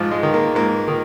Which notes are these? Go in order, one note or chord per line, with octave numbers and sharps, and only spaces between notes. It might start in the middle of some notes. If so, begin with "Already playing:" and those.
Already playing: G#2 F3 F4
G#3
D#3
A#3
G#2 A#3
D#3